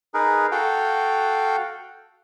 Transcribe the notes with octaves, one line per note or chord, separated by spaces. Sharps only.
D#4 G#4 A#4 B4
F#4 A4 F5 G5